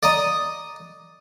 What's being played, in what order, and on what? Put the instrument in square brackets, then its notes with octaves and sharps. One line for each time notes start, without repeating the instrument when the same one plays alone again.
[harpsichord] D5 D#5 A#5 D#6